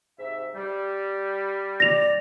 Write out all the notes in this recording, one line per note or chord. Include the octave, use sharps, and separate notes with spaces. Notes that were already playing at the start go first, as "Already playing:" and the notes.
G#2 C3 E5
G3
D5 A#6 F7